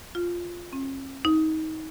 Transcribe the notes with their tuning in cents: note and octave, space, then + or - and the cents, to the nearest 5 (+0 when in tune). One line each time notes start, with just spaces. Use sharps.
F4 +0
C#4 -45
D#4 +25